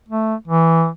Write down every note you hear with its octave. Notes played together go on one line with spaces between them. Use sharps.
A3
E3